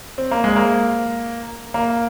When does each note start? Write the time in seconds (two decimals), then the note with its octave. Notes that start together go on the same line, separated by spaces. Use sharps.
0.18 C4
0.31 A#3
0.44 G#3
0.56 A#3
1.74 A#3